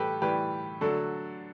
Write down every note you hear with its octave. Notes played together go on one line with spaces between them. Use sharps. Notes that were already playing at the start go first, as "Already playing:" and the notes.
Already playing: A2 E3 G3 G4 A4 B4
A2 E3 G3 G4 B4
D3 F#3 A3 F#4 A4